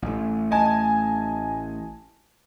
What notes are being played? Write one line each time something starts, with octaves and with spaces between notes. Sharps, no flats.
A1 A3
D#5 G#5 A5